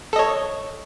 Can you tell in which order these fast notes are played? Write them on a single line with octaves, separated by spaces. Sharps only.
A4 D#5 C#5